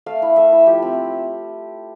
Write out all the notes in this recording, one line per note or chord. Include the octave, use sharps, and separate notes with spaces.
A3 F5
E4
A3 E5
E4
F3 G4
C4 E4